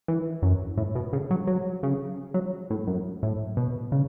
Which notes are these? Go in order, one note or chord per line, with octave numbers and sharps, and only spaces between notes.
E3
F#2
A2
B2
C#3
F#3
F#3
C#3
F#3
A2
F#2
A2
B2
C#3